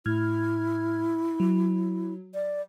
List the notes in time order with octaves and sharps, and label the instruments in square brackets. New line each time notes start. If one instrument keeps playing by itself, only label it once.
[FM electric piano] A2 F6 G#6 [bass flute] E4
[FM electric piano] F#3
[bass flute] D5